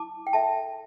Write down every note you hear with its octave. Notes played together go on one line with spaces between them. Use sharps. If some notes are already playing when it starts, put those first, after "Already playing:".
Already playing: E4 A5 D6
G5
A4 E5 A5